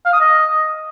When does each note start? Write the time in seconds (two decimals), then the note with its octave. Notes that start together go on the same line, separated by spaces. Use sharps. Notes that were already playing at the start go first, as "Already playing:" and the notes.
0.05 F5
0.13 D#6
0.21 D#5